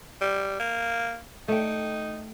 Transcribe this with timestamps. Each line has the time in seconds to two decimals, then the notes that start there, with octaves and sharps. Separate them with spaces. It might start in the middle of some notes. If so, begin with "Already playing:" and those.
0.21 G3
0.60 A#3
1.48 A3 D#4 G5